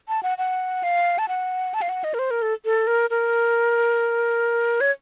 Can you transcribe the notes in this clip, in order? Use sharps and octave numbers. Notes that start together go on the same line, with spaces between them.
A5
F#5
F#5
F5
A5
F#5
A5
F5
F#5
D#5
A#4
C5
A#4
A4
A4
A#4
A#4
C#5